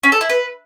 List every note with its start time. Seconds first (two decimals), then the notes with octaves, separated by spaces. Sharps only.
0.03 C#4
0.12 A4
0.21 E4
0.29 B4